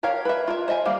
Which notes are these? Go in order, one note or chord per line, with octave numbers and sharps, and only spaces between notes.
G4 A#4 C#5 F5
B4 E5
F4 A#4 E5
C5 D#5 E5 G#5
G3 A#3 F5